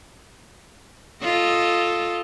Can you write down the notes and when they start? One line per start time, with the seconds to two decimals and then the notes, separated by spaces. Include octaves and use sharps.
1.23 F4 A4 D#5